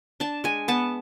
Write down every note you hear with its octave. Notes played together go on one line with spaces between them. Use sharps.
D4 A5
G#3 G#5
B3 A5